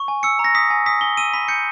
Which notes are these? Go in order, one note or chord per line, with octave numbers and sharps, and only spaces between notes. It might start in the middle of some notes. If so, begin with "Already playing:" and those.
Already playing: C#6
G#5
E6 C#7
A#5
A#6
D#6 B6
G#5
D#6 B6
G#5 G7
E6 D#7
B5 B6
G6 C#7